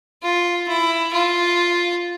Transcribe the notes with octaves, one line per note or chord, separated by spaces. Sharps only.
F4
E4
F4